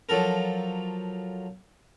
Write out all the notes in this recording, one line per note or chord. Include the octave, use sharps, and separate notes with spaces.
F3 F#3 A4 A#4